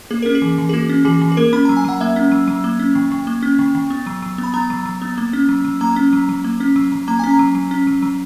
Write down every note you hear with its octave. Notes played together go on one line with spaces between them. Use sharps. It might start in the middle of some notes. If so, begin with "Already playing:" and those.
A#3 G#4
C#4 A#4
G#4
E3
E3
G#4
A#3 F#4
C#4
E3 G#4
E3
G#4
A#3 A#4
C#4 B5
F#3 A#5
G#5
F#3 F#5
A#3 E5
C#4
F#3
F#3
A#3
C#4
D#3
D#3
A#3
C#4
D#3
D#3
B3
F#3
F#3
B3
B5
B3 A#5
F#3
F#3
B3
A#3
C#4
F#3
F#3
A#3 A#5
C#4
F#3
F#3
A#3
C#4
F#3
F#3
A#3 A#5
C#4 G#5
A#5
F#3
F#3
C#4
F#3
F#3